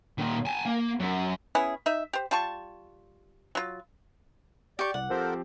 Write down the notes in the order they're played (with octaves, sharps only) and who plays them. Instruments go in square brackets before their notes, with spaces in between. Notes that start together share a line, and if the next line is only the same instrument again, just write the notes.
[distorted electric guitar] A#2 D#3
G#5 A5
A#3
F#2
[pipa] B3 C#4 E4 G#4
D#4 E5
G4 C5
G3 F4 A5 C#6
F#3 F4
[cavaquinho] G4 C#6 [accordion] D5
[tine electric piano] C2 [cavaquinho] F#5
[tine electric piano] F3 C4 G4 [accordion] A4 A#4 C5